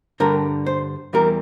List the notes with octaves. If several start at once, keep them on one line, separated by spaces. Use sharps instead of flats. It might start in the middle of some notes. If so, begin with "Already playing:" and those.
G2 D3 G3 A#4
C5
E2 E3 G3 A#4